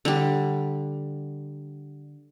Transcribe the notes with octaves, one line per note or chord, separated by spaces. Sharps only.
D3 G3